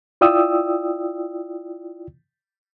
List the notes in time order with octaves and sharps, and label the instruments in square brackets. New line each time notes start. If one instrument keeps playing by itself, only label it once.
[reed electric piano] E4 F4 D5 G5 D#6 E6